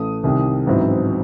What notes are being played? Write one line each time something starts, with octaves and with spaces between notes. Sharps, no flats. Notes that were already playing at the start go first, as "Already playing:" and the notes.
Already playing: A1 A3 D#6
C2 C3 D#3
A1 G#2 F#3 C4 E4